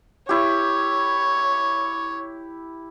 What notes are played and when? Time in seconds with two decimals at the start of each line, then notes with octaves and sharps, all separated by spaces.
0.29 E4 G4 C#5